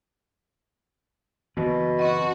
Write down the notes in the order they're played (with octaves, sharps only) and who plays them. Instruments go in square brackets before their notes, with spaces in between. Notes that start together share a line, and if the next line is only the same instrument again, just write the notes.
[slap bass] F#1 E3 B3 [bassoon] B2
[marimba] C4 D#5 [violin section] F#4